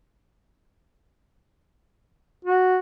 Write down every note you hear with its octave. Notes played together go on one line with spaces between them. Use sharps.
F#4